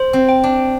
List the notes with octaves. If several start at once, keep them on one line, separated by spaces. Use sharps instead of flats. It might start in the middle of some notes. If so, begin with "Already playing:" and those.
Already playing: C5
C4
G5
D4